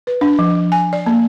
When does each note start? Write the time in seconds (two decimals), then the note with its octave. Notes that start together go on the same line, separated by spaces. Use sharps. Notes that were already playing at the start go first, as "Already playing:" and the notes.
0.07 B4
0.21 D4
0.39 F3
0.72 G#5
0.93 D5
1.06 A#3